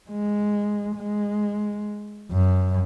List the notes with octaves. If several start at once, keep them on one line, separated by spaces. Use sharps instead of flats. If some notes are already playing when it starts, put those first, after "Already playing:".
G#3
G#3
F#2